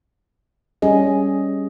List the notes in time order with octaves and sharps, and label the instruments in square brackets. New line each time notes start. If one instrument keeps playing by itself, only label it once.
[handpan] G3 C#4 G#4 D#5